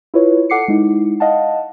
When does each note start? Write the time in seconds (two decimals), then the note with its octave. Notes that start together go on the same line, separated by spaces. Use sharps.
0.14 E4 F4 B4 C#5
0.50 A4 F#5 D6 C7 C#7
0.68 G#3 D#4 E4
1.20 D#5 F5 F#5 A5